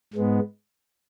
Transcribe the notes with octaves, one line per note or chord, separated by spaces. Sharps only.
G#2 G#3 B3